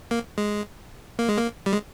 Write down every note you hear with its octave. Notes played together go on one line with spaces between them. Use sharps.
A#3
G#3
A#3
G#3
A#3
G3
G#3